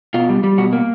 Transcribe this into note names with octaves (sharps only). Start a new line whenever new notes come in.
B2 F4
G3
G3
B2 F#4
A#3